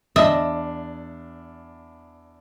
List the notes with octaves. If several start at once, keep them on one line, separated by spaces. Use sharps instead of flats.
E2 D4 D#5 E5